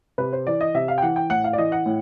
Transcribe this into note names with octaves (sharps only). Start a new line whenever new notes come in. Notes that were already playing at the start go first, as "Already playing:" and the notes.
C3 B4
C5
E3 D5
D#5
C3 E5
F5
G5
E3 F#5
G5
A2 F#5
F5
D5
E3 D#5
F#5
A2